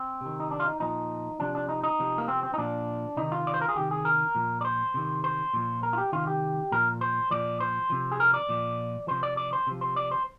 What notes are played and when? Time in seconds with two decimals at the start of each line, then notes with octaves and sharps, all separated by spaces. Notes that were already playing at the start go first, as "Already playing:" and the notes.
Already playing: C4
0.21 C3 D#3
0.40 D#4
0.51 D4
0.60 F4
0.65 D#4
0.80 A#2 F3 D#4
1.40 C3 F3 D4
1.55 D4
1.69 D#4
1.84 D#4
1.99 C3 F3
2.18 A#3
2.28 C4
2.43 C4
2.54 D#4
2.58 A#2 F3 D4
3.17 C3 D#3 D#4
3.32 F4
3.47 D5
3.54 C5
3.61 A#4
3.69 G#4
3.76 C3 D#3 G4
3.91 G#4
4.05 A#4
4.35 A#2 F3
4.61 D5
4.65 C5
4.94 C3 D#3
5.24 C5
5.54 A#2 F3
5.83 A#4
5.93 F4
5.98 G4
6.12 C3 D#3 F4
6.27 G4
6.72 A#2 F3 A#4
7.01 C5
7.31 A#2 F3 D5
7.60 C5
7.90 C3 F3
8.12 G#4
8.20 A#4
8.34 D5
8.49 A#2 F3
9.07 C3 F3 C5
9.23 D5
9.37 D5
9.53 C5
9.67 C3 F3
9.81 C5
9.96 D5
10.11 C5